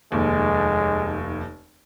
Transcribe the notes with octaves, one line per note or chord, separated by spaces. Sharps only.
F1 D#2 G#3